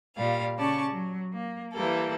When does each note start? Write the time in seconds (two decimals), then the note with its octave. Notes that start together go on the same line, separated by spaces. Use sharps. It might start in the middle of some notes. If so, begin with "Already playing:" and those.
0.16 A#2 G3 F5
0.57 C#3 C#4 D5 A5 C#6
0.90 F#3
1.33 A#3
1.73 E3 G3 A#3 A4